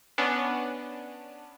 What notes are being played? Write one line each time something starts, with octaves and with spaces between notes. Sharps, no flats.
B3 C#4 D4